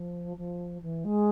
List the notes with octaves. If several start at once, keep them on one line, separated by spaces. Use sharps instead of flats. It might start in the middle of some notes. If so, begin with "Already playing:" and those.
Already playing: F3
F3
E3
G#3